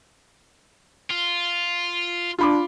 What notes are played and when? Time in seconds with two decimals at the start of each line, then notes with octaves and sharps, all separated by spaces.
1.10 F4
2.39 D4 F4 B5 D6